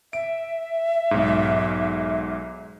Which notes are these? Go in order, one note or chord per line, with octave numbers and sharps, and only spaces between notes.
E5 D7
B1 G#2